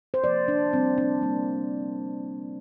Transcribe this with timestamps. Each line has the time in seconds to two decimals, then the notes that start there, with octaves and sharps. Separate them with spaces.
0.14 C5
0.23 C3 F3 A#3 D5
0.48 D4
0.72 C3 G3 A#3 C4
0.98 D4
1.22 D3 G3 A#3